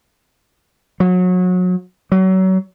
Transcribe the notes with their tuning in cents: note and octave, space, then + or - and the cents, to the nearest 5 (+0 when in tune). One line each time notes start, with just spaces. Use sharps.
F#3 -30
F#3 +30